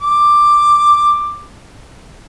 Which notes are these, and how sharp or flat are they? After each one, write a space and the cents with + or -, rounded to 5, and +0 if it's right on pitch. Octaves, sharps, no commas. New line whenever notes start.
D6 +10